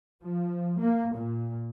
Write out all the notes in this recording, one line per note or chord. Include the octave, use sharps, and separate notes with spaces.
F3
A#3
A#2